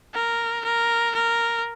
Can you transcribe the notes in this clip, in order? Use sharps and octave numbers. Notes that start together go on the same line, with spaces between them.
A#4
A#4
A#4